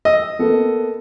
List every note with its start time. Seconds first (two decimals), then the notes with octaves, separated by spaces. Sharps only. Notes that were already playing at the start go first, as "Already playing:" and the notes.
0.05 D#5 E6
0.39 A#3 B3 A4